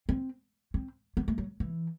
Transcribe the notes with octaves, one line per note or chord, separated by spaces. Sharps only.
C4
C4
B3
A3
F#3
E3